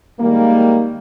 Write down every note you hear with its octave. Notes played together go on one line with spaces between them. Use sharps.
D#3 G3 G#3 A#3